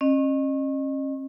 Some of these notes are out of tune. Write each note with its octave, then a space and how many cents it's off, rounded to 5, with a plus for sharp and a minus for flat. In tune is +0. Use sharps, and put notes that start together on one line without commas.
C#4 -35 D#5 -30